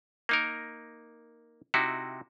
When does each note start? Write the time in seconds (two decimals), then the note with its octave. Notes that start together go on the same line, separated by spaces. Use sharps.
0.29 A#3 D#4 A#4
1.74 C3 D#4 E4 F#4